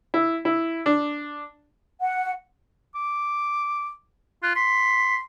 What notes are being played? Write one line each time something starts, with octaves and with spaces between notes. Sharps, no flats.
E4
E4
D4
F#5
D6
F4 F#6
C6 B6